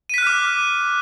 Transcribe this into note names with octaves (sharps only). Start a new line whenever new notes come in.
D6 F6 F#6 B6 D#7